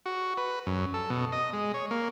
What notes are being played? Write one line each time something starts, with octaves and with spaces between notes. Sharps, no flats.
F#4
B4
F#2
A4
B2
D#5
G#3
C#5
A#3